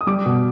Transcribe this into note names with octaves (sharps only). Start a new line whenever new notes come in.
D#6
G3 D6
B2